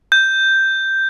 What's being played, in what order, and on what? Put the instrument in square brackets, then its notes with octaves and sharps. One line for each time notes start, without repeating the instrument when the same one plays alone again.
[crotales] G6